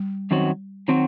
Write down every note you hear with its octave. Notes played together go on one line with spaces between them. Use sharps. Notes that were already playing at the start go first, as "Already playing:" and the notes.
Already playing: G3
F#2 D#3 F#3 C4 F#4
D#3 F#3 C4 F#4